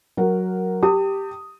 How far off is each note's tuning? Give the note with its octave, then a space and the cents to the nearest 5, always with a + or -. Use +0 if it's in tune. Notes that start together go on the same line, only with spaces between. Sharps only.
F#3 +0 A#4 +0 F#5 +0
G4 +0 A5 +45 D#6 +0